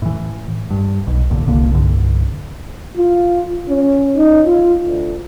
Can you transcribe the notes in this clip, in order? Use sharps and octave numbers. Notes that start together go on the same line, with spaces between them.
A2 E3
G2
B1 B2
G#1 D#2 A#2 D3
D#1 C2 D3 A#3
C2 G2 D3
F4
C#4
D#4
F4
D2